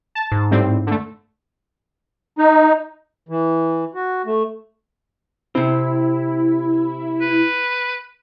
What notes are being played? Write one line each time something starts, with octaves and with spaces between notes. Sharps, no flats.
A5
G#2
A2 G3 C4
D3 A3
D#4
E3
F#4
A3
C3 C4 E4
B4